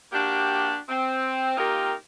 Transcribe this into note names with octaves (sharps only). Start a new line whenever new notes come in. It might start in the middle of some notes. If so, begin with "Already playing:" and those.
A#3 D4 F#4 G4
C4
A#3 C4 D#4 F4 G4 A#4